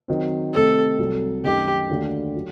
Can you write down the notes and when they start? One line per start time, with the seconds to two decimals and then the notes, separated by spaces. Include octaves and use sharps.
0.08 D#3 F#3 C4
0.54 C3 D#3 A3 C4 A4
0.99 C2 C3 F#3
1.44 F#2 D#3 A3 D#4 G4 A4
1.90 D#2 D3 A3 D4 F#4
2.36 F#3